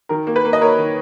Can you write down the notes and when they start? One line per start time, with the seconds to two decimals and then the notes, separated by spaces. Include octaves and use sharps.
0.09 D#3 A#4
0.27 A#3
0.36 B4
0.45 A#3
0.53 D#5
0.61 A#3 A#4 C#5
0.79 D#3